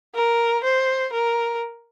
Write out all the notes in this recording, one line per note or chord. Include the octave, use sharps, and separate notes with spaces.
A#4
C5
A#4